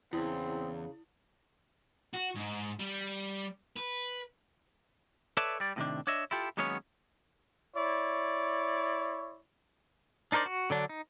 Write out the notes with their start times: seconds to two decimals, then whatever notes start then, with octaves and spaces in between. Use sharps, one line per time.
0.13 E2 C#3 C4 E4
2.13 F#4
2.35 G#2 D#4
2.79 G3
3.77 B4
5.37 A4 B4 C#5 D5 E5 A5
5.60 G3 D5
5.76 A2 C3 D#3 D4
6.07 D4 C#5 D#5 E5
6.31 E4 F4 G4 A4
6.57 D#2 F#3 G#3 B3 C#4 C#5
7.76 E4 C#5 D5
10.32 D4 D#4 A#4 C5 D5
10.46 F#4
10.70 D3 F#3 D4
10.89 D#4